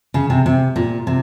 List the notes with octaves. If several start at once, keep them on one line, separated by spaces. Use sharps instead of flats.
C#3
C3
C3
A#2
C3